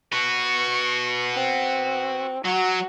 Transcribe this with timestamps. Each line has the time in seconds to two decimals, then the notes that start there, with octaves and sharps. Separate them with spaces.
0.12 F#4 B4 C#6
1.33 C4
2.45 F#3 F#4